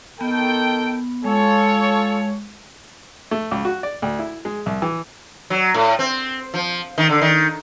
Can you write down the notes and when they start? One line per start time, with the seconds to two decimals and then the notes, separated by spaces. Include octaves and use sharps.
0.21 D#3 B3 A4 G5
1.24 G#3 F4 A4 C#5
3.31 A3
3.51 C#2
3.65 F#4
3.83 D5
4.02 D2
4.19 E4
4.45 G#3
4.66 C2
4.82 E3
5.50 F#3
5.74 A2
5.99 C4
6.54 F3
6.98 D#3
7.09 D3
7.21 D#3